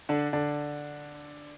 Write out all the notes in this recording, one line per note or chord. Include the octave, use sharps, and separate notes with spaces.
D3 D4
D3 D4